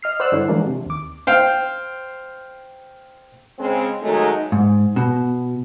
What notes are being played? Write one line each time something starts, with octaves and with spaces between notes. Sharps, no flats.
D#5 F6 C7
C5 D5 F#5 E6 F#6
G2 D3 E4 C#5 C7
D3 E3 F3 G#3 A#3 D4
C3
D#2 D6
C5 F5 G5
C#3 G#3 C4
D#3 F#3 G#3 A3 D#4
G#2
B2